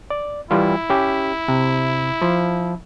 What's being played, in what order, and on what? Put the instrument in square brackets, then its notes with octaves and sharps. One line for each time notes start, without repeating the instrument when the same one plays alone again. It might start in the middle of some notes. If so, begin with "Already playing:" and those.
[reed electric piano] D5
[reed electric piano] E3 G3 F4 [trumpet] E4
[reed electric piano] C#4 G4
C3
F3